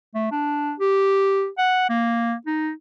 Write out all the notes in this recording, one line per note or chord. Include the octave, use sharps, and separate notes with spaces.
A3
D4
G4
F#5
A#3
D#4